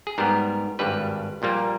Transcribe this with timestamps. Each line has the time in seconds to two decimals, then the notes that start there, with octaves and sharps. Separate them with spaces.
0.07 G#4
0.18 G#2 G3 B3 A#4
0.79 G#1 G2 G3 B4
1.42 A#1 A#2 G3 A#3